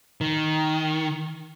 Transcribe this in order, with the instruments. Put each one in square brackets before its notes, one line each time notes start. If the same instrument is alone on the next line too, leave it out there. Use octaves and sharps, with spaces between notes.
[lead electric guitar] D#3